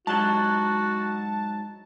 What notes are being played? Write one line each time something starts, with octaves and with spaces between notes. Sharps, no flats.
G#2 F#3 F#4 A5